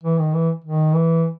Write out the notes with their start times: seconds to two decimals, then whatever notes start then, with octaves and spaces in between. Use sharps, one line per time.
0.04 E3
0.19 D#3
0.34 E3
0.65 D#3
0.94 E3